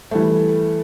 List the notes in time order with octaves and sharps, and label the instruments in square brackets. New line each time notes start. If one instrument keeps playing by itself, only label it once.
[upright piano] E3 G3 A3